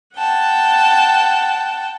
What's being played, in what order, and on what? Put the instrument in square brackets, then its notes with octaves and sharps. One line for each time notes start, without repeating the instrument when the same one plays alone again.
[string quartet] F#5 G5 A5